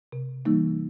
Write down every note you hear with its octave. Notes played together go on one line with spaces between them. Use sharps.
C3
E3 G3 A#3 D#4